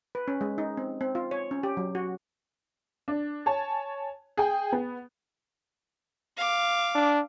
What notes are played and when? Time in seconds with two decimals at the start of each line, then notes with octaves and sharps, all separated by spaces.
0.15 B4
0.28 C#4
0.41 G#3
0.58 D#4
0.77 C4
1.01 C4
1.15 F4
1.31 C#5
1.51 C#4
1.63 G4
1.77 F#3
1.95 F#4
3.08 D4
3.46 C#5 G#5 A5
4.37 G#4 G5
4.72 B3
6.37 F5 D6
6.95 D4